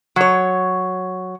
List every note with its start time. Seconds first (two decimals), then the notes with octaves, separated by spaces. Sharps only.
0.16 F#3 C#5